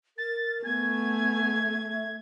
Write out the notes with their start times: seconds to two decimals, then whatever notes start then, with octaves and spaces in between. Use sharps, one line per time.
0.17 A#4 A6
0.65 A3 B3 G#5 G#6
1.60 E5